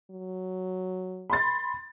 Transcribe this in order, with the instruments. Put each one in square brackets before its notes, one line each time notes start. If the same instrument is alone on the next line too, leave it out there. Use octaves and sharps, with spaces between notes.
[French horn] F#3
[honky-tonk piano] B5 C6 A6